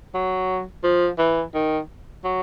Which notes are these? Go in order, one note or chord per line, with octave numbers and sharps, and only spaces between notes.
F#3
F3
E3
D#3
F#3